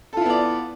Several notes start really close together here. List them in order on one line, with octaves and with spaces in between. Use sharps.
A4 F4 E4 B3 D5